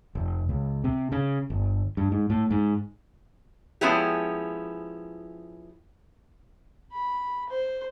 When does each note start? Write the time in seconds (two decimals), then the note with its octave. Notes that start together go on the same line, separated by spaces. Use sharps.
0.15 F1
0.49 C#2
0.84 C3
1.12 C#3
1.50 G1
1.97 G2
2.12 G#2
2.30 A2
2.51 G#2
3.81 F3 G#3 B3 C#4 E4 G4
6.93 B5
7.50 C5